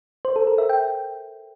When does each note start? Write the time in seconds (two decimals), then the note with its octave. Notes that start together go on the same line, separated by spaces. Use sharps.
0.25 C5
0.36 A4
0.47 A#4
0.58 E5
0.69 G5